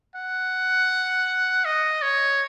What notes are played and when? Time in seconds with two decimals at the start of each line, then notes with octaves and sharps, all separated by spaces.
0.16 F#5
1.65 D#5
2.02 C#5